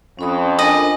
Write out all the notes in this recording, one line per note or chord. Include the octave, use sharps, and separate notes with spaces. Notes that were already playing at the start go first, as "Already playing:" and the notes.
F2 C#4 B5 D#6
D4 A4 A#4 D#5 G#5 D#6